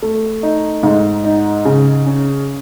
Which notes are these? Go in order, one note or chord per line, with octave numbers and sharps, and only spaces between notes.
A3
D#4
G#2
D#4
C#3
C#4